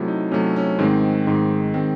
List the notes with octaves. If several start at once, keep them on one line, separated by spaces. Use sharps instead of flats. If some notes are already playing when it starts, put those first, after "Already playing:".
Already playing: C3 F#3 A3 E4
D#4
C3 F#3 A3 C#4
C#4
G#2 D#3 G#3 C4
G#2 D#3 G#3
D#3 G#3 C4